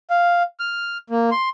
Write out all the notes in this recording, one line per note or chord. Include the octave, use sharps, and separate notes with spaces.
F5
F6
A#3
C6